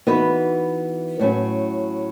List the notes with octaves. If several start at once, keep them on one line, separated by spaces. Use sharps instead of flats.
E3 B3 D#4 F#4 B4
A2 F#3 A3 C#4